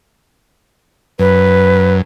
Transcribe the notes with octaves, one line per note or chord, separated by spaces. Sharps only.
F#2 B4